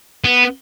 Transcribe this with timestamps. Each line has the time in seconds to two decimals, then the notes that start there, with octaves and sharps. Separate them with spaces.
0.25 B3